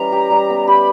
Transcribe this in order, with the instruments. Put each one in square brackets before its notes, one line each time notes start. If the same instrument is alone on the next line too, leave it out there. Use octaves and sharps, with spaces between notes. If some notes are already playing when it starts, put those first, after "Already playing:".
Already playing: [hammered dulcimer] E3 G3 C#4 [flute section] A#5
[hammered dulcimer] G4
G3
B3
[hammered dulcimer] G4 [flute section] B5